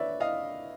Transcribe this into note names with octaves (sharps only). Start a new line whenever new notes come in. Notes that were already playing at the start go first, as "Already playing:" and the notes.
Already playing: B4 C#5 D5 E5
D#5 F5